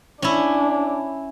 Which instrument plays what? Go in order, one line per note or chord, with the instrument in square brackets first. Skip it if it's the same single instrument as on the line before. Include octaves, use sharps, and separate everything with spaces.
[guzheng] C#4 E4 [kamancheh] D4